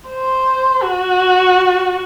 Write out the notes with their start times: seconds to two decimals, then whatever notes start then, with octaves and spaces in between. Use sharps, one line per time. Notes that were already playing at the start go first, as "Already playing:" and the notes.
0.09 C5
0.82 F#4